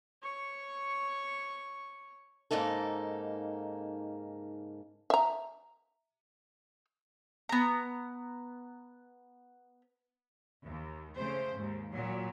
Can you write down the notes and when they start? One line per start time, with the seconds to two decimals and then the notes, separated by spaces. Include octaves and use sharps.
0.22 C#5 C#6
2.51 G#2 C#3 A#3 D#4 A4
5.10 E5 A#5
7.49 B3 A#5
10.63 D#2
11.16 C#3 A3 C5
11.54 D#2 G#2
11.90 A#2 F#3